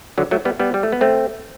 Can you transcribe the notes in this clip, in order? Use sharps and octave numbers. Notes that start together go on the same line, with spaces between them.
D3 F#3
F#3 A3
G3 B3
G3 B3
G3
A3
B3
A3 C4